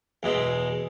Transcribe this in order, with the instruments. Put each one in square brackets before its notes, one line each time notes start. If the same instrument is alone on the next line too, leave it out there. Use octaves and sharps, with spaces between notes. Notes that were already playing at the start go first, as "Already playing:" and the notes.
[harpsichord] E2 B2 G#3